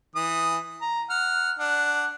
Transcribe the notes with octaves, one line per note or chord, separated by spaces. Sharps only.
E3 D#6
A#5
F#5 F6
D4 F#5